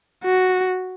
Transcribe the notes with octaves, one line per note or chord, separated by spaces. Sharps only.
F#4